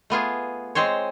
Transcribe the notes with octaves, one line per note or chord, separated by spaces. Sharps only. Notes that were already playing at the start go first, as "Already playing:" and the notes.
A3 B3 F4 G#4
G#3 C4 C5 C#5